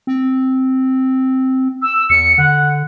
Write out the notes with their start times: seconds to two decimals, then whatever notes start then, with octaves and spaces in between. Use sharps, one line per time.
0.07 C4
1.82 E6
2.10 E2 C#7
2.38 D3 F#5